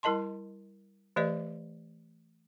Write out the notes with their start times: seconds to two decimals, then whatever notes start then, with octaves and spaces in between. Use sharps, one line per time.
0.03 G3 E4 A#4 D#5 A5 C6
1.16 E3 A3 G4 B4 D5 D#5